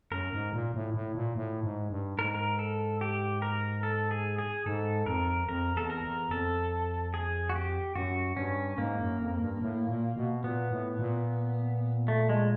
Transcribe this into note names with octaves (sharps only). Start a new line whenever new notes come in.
F#2 A#4
G#2
A#2
A2
A2
A#2
A2
G#2
G2
G#2 A#4
A#4
A4
G4
A#4
A4
G#4
G#4
G#2 A4
F2 A#4
F2 A#4
E2 A4
A#4
E2
F2 A4
G#4
F#4
G4
F#2 F#4
G2 C#4
G#2 A#3
F#2
F2
G2
A2
A#2
B2
A#2 B3
A2
A#2
A3
G#3